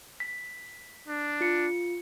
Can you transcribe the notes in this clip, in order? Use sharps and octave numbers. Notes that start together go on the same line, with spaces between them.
B6
D4
F4 C#7